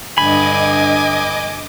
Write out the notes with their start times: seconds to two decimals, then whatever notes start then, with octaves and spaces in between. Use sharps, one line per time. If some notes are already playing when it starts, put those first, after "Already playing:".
0.18 G2 D3 D#5 G#5 B5 D6